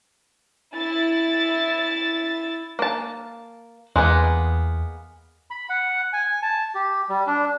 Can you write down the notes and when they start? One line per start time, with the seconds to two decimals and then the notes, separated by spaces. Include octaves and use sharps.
0.75 E4 A6
2.79 A#3 A5
3.96 E2 G#3 A#3 B3
5.50 B5
5.70 F#5
6.13 G#5
6.42 A5
6.75 G4
7.09 G3
7.27 D4